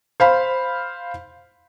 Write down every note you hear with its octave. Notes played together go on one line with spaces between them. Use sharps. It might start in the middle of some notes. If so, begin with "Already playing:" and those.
C5 F5 B5